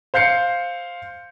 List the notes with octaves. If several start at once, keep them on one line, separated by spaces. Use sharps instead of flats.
C5 F5 G6 C7 C#7